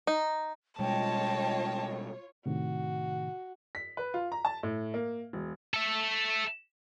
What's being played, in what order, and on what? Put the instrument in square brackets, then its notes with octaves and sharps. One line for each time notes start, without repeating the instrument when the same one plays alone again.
[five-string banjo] D#4
[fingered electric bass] B2 G3 G#3 [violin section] F4 C#5 [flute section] D#5 G5 [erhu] A5
[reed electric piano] A2 C3 D#3 [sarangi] F#4
[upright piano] B6
B4
F4
A#5
A5
A2
A#3
E1
[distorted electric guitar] A4 E5